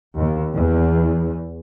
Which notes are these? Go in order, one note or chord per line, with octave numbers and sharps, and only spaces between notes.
D#2
E2